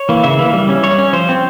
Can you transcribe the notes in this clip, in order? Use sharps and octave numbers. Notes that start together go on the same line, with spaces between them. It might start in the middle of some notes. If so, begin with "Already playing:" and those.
Already playing: C#5
E3 A#3
C#3 E5
E3 A#3
G3
C#4
G3 C#5
C#4
F3 C5
C4